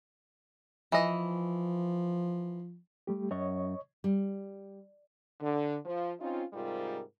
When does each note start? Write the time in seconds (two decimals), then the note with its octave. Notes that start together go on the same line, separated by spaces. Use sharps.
0.92 E3 F3 D#5
3.07 G3 A3 G4
3.31 F#2 C#5 D#5 C#6
4.04 G3
5.41 D3
5.85 F3
6.19 C4 C#4 D#4 F4
6.53 G#2 C3 G3 F4 A#4